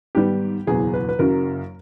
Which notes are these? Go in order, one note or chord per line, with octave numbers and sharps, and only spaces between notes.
G#2 D#3 G3 B3 G4
F#1 E2 B2 F#3 G#4
B4
B4
F#1 F#2 C#3 F#3 A#4